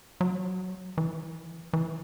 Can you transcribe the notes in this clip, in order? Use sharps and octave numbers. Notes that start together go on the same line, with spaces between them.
F#3
E3
E3